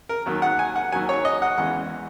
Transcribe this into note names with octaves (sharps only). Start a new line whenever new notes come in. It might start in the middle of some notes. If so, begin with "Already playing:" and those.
A#4
D#2 D#3 F#3
F#5
G#5
F#5
D#2 D#3 F#3 G#5
C#5
D#5
F#5
E2 C#3 E3 G#3 F#5